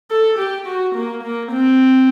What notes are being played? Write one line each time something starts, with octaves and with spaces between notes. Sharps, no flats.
A4
G4
F#4
A#3
A#3
C4